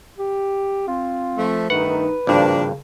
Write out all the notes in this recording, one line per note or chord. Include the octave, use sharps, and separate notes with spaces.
G4
C4 F4
F3 A3
G2 D#3 A3 D#4 B4 F#5
G#1 G2 C#3 F3 A#3 D4